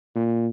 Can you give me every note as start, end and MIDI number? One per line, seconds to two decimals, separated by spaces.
0.15 0.48 46